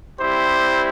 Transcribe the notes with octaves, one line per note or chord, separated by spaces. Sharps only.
G3 C4 E4 G4 C5